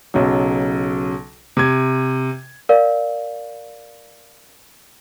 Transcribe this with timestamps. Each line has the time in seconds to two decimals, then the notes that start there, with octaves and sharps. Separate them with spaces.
0.14 B1 C#3 F#3
1.57 C3 G#6
2.69 A#4 D5 F5